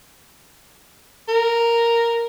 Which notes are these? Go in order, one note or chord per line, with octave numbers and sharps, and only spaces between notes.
A#4